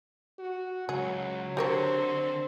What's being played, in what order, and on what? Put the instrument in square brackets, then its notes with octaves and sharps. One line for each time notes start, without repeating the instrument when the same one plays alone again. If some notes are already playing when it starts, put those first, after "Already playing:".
[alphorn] F#4
[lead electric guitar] C#2 [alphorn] F#3 [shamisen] G#4
[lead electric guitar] D3 [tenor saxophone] C4 [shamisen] G4 A#4 C#5